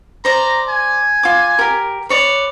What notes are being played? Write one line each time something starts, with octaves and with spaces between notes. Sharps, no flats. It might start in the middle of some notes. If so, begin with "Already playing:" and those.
C5 D5 A#5
G#5
F4 D6
G4 A#4
B4 C#5 D5